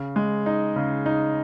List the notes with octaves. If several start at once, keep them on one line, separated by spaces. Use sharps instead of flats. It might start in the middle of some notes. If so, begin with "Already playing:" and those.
Already playing: C#3
G#3
D#4
C#3
D#4